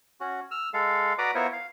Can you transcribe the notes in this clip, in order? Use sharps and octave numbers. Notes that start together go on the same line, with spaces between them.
C#4 F#4
E6 F6
G#3 A4 F5
F#4 B4 D5 A#5 D6 D#6
B3 E4 F4 A#4 C5 C#5
F5